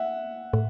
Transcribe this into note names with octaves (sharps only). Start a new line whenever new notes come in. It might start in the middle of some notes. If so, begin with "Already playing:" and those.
Already playing: E5 F#5
A2